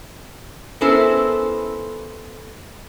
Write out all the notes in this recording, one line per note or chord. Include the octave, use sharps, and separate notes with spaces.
B3 C#4 E4 A4 A#4 C5